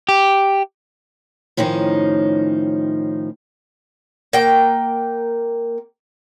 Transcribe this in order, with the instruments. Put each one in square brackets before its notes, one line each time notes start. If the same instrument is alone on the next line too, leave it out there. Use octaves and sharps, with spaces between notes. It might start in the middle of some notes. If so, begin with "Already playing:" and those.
[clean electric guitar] G4
[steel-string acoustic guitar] A2 D#3 F3 C#4 D#4
[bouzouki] A#3 G5